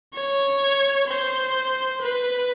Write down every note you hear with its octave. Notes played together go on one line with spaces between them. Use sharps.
C#5
C5
B4